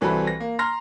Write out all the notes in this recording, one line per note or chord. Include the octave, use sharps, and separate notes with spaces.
C2 E3 C4 F#4 A4 B5
A#6
A#3
A#5 C6 F6 A#6